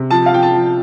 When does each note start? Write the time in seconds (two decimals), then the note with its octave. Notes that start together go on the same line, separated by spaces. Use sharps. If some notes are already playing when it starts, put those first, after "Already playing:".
Already playing: C3
0.11 F3 A5
0.26 F5
0.32 F3 G5
0.43 A5
0.54 F3